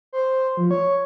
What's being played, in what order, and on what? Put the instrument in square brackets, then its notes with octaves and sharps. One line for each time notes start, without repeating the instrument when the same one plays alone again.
[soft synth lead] C5
F3
C#5